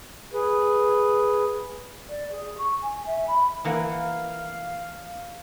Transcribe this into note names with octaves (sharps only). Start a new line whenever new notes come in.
G#4 B4
D5
G#4
C#6
G#5
E5
B5
E3 A#3 F5 F#5